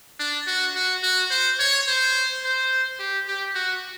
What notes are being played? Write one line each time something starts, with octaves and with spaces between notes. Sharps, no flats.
D4
F#4
F#4
F#4
C5
C#5
C5
C5
G4
G4
F#4